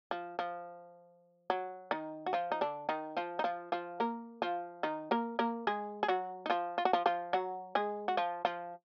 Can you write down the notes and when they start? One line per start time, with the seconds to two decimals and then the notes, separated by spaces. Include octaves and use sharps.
0.11 F3
0.39 F3
1.50 F#3
1.91 D#3 D#4
2.26 F#4
2.33 F3 F4
2.52 D#4
2.61 D3 D4
2.89 D#3 D#4
3.17 F3 F4
3.39 D#4
3.44 F3 F4
3.72 F3 F4
4.00 A#3 A#4
4.42 F3 F4
4.83 D#3 D#4
5.11 A#3 A#4
5.39 A#3 A#4
5.67 G#3 G#4
6.03 G#4
6.08 F#3 F#4
6.46 D#4
6.50 F3 F4
6.78 F4
6.85 F#4
6.93 F3 F4
7.06 F3 F4
7.33 F#3 F#4
7.75 G#3 G#4
8.08 F#4
8.17 F3 F4
8.45 F3 F4